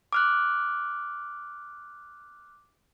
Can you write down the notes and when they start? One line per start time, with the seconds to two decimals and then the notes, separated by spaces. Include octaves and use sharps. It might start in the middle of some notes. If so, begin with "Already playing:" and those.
0.13 D6 F6 F#6